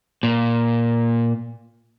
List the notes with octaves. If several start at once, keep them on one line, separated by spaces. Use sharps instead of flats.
A#2